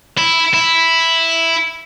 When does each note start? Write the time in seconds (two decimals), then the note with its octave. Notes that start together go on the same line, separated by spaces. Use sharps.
0.18 E4
0.54 E4